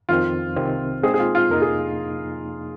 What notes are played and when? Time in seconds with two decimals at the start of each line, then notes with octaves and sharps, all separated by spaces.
0.09 F2 D#3 C4 F4
0.56 C2 C3 D#3 C4
1.03 A#2 G#3 C4 D#4 G#4
1.14 G#4
1.19 F4
1.35 F4
1.50 F2 C3 F3 A#3 D#4 A#4
1.62 G#4